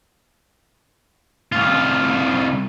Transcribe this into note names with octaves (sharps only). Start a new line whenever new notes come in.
C2 F4